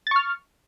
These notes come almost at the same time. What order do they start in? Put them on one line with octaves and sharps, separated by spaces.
A6 C#6 F6